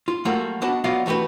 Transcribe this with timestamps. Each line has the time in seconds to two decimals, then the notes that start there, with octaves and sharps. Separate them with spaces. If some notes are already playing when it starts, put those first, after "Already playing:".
0.08 F4
0.25 F#3 G3 A3 A#3 F4 F#4
0.62 B3 D4 F#4 D#5 A5 B5
0.84 F#3 B3 F4 D5 D#5 F5
1.06 E3 A3 F#4 G4 B4